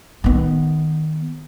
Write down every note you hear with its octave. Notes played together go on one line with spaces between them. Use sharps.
D#3 B3